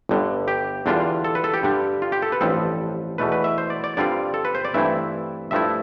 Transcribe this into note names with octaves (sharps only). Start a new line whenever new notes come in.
G1 G2 D3
G4
E2 D3 G3 D4 F4
A4
B4
A4
G4
G2 D3 G3
F4
G4
A4
B4
A1 G2 F3 C4 A4
E2 B2 A3 B4
B4
E5
C5
D5
D5
G2 D3 G3 C4 F4 D5
A4
B4
C5
D5
G2 E3 A3 C4 E4 E5
G2 F3 A3 E4 E5